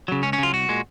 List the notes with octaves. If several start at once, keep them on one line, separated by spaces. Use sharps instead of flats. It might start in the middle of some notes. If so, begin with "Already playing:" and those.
C#3 F#3
C#2 C#4
C#4
C#3 F#3 F4
C2 F#4
A#2 G#3